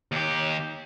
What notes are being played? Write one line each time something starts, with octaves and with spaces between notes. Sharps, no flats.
D#2 G4